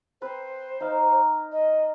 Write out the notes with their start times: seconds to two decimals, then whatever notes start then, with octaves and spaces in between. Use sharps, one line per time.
0.22 C4 B4 C5
0.80 D#4 A#4 F5
1.52 D#5